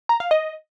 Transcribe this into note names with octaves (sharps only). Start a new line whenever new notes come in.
A#5
F5
D#5